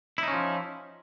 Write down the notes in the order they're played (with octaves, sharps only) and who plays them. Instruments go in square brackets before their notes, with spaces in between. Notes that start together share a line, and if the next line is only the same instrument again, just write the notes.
[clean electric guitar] E4
D#4
C#4
F3